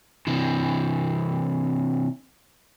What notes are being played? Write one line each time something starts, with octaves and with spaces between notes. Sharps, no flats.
C3 E3